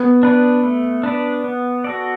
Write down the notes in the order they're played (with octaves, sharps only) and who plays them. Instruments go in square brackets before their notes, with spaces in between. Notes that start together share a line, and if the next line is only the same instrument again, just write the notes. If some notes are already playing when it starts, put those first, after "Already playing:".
Already playing: [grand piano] B3
[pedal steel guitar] D4 B4 D5
A3
D4 B4 D5
B3
F#4 A4 D5